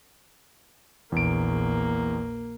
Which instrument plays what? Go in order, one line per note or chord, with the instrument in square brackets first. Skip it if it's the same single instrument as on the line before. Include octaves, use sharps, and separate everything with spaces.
[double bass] A#1 [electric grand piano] E2 D7 [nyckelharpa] A#3